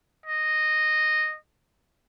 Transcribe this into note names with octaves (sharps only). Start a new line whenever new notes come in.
D#5